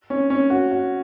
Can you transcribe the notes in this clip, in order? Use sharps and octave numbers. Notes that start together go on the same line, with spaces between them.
C#4
C#4
F#4
F#4